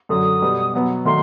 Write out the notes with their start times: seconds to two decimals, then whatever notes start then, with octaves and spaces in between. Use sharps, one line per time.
0.09 F#2 D3 F#3 D#6
0.42 B2 G3 B3
0.74 B2 F#3 B3
1.05 D#3 F#3 A3 C6